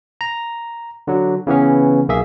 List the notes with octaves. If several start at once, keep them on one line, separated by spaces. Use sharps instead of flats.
A#5
D3 F#3
C#3 E3 B3 C#4
B1 A#3 G#4 E5